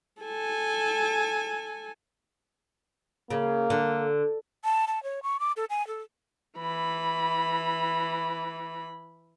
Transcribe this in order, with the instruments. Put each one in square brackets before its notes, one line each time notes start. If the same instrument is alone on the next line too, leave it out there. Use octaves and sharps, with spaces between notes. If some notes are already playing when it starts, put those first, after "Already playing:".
[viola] A4 G#5
[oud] C#3 [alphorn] A#3
[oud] D3
[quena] A5
A5
C#5
C#6
D6
A4
G#5
A4
[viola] E3 B5